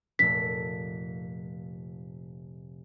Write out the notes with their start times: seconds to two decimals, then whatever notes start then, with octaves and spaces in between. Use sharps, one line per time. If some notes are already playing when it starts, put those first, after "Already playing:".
0.19 F1 A#2 A3 B6